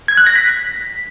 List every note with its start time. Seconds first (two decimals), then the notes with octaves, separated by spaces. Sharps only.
0.08 G#6
0.17 F#6
0.26 A#6
0.35 B6